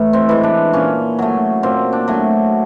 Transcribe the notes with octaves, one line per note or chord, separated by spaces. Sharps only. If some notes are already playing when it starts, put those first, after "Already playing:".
Already playing: A2 E3
C4
E3 G#3
D4
A#2 C#4
F#3 A3
A#2 C4
D4
F#3 A3